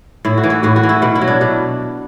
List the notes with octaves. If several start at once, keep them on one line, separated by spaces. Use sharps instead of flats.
A2 E4
F#4
E3
E4
A2 F#4
F#4
E3
E4
B2 E4
E4
F#3
D4
B2 D4